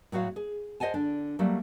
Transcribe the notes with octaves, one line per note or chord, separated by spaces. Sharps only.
A2 F#3 F#4 C#5 F5
G#4
C5 D#5 F#5 G#5 A5
D3 D4
F#3 G3 A3 A#3